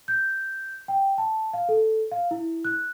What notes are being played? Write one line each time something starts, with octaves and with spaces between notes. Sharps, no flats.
G6
G5
A5
F5
A4
F5
E4
F#6